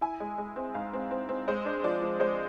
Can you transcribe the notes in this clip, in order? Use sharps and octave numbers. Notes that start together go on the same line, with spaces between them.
E4 G#5
G#3
G#3
C4
G#2 F5
C4
C4
C4
G#3 C5
D4
F3 D5
F3
G#3 C5